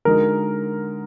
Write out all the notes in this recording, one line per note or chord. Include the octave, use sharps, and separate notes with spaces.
D3 G#3 D#4 F#4 A#4